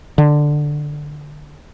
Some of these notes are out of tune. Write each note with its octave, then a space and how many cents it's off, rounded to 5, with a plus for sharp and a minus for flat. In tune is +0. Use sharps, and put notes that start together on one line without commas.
D3 +10